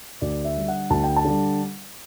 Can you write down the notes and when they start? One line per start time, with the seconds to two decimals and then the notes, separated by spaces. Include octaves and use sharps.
0.21 D2 D5
0.44 E5
0.56 D3 G3
0.68 F#5
0.90 D2 A5
1.04 G5
1.16 A5
1.24 D3 G3